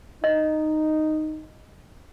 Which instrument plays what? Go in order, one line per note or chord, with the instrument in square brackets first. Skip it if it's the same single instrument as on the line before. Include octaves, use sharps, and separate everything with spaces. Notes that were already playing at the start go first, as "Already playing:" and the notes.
[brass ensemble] D#4 [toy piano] D#5